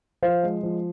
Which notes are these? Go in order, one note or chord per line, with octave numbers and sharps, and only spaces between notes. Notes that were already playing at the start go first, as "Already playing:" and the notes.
F3 C5 F5
G#3
F3